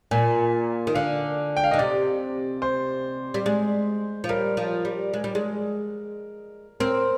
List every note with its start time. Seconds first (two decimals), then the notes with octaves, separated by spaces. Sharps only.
0.11 A#2 G#5
0.87 D#3
0.95 D3 F5
1.57 G5
1.64 F5
1.71 D3 D#5
1.78 C3 D5
2.62 C5
3.34 G3
3.46 G#3
4.24 F3
4.29 G3 A#4
4.57 F3
4.85 G3
5.13 G#3
5.24 G3
5.35 G#3
6.80 C4 A#4